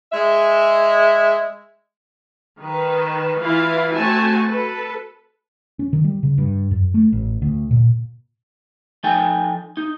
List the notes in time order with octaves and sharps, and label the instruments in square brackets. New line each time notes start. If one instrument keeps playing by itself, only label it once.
[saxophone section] G#3 E5
[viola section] D#3 B4
E3 E4 F4 F5
A3 C4 F#4 G#5 A5
A4 B4
[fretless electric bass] C#4
D#3
G3
C#3
G2
F#2
A3
A1
D2
A#2
[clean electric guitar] F3 D#4 A4 G5 G#5
D#4